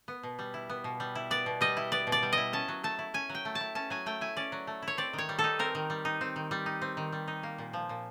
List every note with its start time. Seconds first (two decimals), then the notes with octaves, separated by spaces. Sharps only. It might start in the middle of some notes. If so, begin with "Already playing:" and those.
0.08 B3
0.23 B2
0.39 G3
0.54 E4
0.70 B3
0.84 B2
1.00 G3
1.15 E4
1.31 B3 D5
1.46 B2
1.61 G3 D#5
1.77 E4
1.92 B3 D5
2.07 B2
2.12 D5
2.23 G3
2.33 E4 D#5
2.53 C#4 A5
2.68 F#3
2.84 A3 A5
2.99 E4
3.14 C#4 G#5
3.30 F#3
3.35 G5
3.45 A3
3.55 A5
3.61 E4
3.75 C#4 A5
3.90 F#3 G#5
4.06 A3 G5
4.21 E4 G#5
4.37 C#4 D5
4.52 F#3
4.67 A3
4.82 E4
4.88 C#5
4.98 C4 D5
5.13 D#3
5.18 C#5
5.29 G3
5.39 A4
5.44 D#4
5.59 C4 A#4
5.75 D#3
5.90 G3
6.05 D#4
6.21 C4
6.36 D#3
6.51 G3
6.66 D#4
6.82 C4
6.97 D#3
7.13 G3
7.28 D#4
7.43 A#3
7.58 A#2
7.73 F3
7.89 A#2